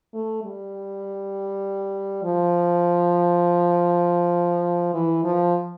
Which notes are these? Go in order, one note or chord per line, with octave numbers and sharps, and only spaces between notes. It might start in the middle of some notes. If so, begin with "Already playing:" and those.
A3
G3
F3
E3
F3